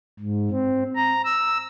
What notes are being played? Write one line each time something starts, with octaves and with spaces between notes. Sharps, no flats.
G#2
C4
A#5
E6